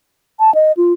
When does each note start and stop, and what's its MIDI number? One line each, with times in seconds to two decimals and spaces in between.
0.40 0.53 81
0.55 0.72 75
0.77 0.93 65